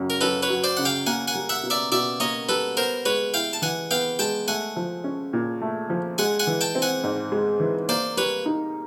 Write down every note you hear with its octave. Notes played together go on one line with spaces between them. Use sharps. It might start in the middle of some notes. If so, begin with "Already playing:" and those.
Already playing: F#2 C#3
A#4
F#2 A4 B4
B4 C#5
F#3
C5 D5
C#3 F#5
F5 G5
A#3 F#5 G#5
F#5 G#5
G3
E5 F#5
B2
D5 E5
B2 D5 E5
A#3 C#5 D#5
G3 A4 B4
B3 A#4 C5
G#3 B4 C#5
E4 F5 G5
A5
E3 F#5 G#5
B3 F5 G5
G#3 G5 A5
A3 F#5 G#5
F3
C#4
A#2
A3
F3
G#3 F#5 G#5
F#5 G#5
E3
G5 A5
C4
F#5 G#5
G#2
G#3
E3
A#3 C5 D5
G3 B4 C#5
D#4